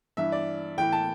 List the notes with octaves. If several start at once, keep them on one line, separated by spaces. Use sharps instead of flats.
G2 E3 E5
D5
A2 E3 G5
A5